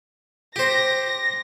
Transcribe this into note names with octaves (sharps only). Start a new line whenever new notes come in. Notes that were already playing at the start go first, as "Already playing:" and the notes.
G4 C5 A#6